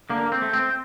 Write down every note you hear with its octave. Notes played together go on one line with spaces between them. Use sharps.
D3 A#3
C4
A3
C4